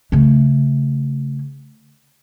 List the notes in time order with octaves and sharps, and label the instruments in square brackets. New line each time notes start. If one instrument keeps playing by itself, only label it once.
[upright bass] C#3 A3